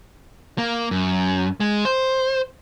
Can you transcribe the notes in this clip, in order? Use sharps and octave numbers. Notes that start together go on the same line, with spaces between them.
A#3
F#2
G#3
C5